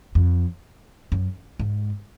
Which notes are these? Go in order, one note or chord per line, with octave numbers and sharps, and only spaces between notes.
F2
F#2
G#2